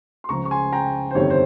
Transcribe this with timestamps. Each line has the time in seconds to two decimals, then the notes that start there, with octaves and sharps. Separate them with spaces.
0.24 C6
0.29 C#2 C#3 F3 A#5 C#6
0.45 C#6
0.51 G#5 C6
0.73 G5 A#5
1.11 C5
1.15 G1 F2 C3 D#3 C#5
1.30 C5